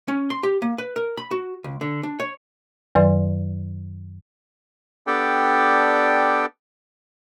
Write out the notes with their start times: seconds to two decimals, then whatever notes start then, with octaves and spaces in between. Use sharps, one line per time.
0.08 C#4
0.30 C6
0.43 G4
0.62 A#3
0.78 B4
0.96 A#4
1.17 B5
1.31 F#4
1.64 C#2
1.81 D3
2.03 D4
2.20 C#5
2.95 F#2 D#3 F#3 B4 D5 C6
5.07 B3 D4 G4 A4 D5 G5